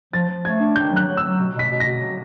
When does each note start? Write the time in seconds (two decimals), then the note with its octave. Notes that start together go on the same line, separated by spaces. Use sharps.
0.13 F3 A6
0.29 F3
0.44 A3 G#6
0.60 D4
0.76 D#3 G6
0.92 F#3 F#6
1.07 F#3
1.17 E6
1.23 F#3
1.39 B2
1.54 B2 B6
1.70 B2
1.80 A#6
1.86 B2
2.02 F#3